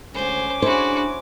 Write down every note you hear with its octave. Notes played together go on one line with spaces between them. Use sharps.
D2 G#3 C#4 C5 G#5 D6
D4 E4 F#4 G#4 C5